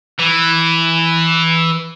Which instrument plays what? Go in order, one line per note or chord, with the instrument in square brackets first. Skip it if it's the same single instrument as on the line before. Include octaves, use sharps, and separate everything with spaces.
[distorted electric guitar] E3